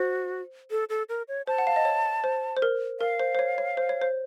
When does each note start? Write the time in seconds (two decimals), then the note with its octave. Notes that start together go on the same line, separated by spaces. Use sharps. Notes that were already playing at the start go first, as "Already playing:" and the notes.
Already playing: F#4 C5
0.71 A4
0.90 A4
1.09 A#4
1.28 C#5
1.47 C5 A5
1.58 F#5
1.67 F5
1.76 D#5
1.85 C#5
2.24 C5
2.57 C5
2.62 A#4
3.00 A#4 F5
3.20 C5
3.35 C5
3.39 C#5
3.58 C#5
3.77 C5
3.89 C#5
4.02 C5